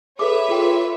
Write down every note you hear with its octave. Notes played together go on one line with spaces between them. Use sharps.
G#4 A4 B4 C#5 E5 D6
F4 G#4 G5